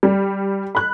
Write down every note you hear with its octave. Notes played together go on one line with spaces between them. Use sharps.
G3
B5 F#6